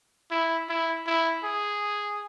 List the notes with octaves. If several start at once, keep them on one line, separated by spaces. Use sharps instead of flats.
E4
E4
E4
G#4